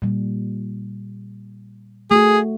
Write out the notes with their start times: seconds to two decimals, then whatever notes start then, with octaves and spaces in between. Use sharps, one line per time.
0.02 A#2 G3
2.11 A3 F#4 G#4